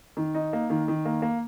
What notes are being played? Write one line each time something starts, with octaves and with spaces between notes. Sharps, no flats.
D#3
D#4
A#3
D#3
D#3
A#3
A#3